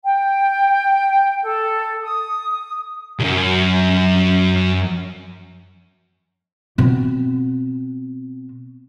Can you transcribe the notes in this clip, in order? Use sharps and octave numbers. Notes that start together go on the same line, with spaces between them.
G5
A4
D#6
C2 F#2
B2 C4